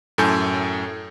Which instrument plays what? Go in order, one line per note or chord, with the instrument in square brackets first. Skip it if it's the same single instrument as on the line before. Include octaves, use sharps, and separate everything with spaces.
[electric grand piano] F#2 A2 A4 G#5 G6